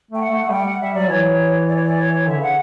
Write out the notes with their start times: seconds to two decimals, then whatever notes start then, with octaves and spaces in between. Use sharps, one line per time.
0.11 A3 G5
0.21 F#5
0.30 A3
0.44 A3
0.50 G3 G5
0.65 F#5
0.80 G3 E5
0.94 F#3 D5
1.09 E3 C#5
1.68 D5
1.75 C#5
1.83 D5
1.98 C#5
2.27 D3 E5
2.38 C#3 F#5